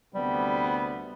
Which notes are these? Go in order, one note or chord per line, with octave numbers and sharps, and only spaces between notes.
D2 C3 G3 B3